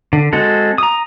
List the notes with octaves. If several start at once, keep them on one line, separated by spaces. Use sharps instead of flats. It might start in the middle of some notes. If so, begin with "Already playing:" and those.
D3
G#3 C4 F#4 A4
A#5 D#6